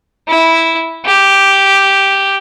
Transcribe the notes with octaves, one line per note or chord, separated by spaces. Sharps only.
E4
G4